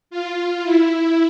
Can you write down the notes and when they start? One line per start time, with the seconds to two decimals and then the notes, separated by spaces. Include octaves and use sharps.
0.11 F4
0.63 E4